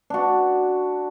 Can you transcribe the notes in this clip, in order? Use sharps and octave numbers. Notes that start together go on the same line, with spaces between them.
D4 F#4